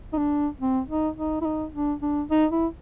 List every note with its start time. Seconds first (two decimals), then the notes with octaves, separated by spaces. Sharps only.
0.13 D#4
0.18 D4
0.61 C4
0.89 D#4
1.17 D#4
1.41 E4
1.45 D#4
1.74 D4
2.02 D4
2.31 D#4
2.52 E4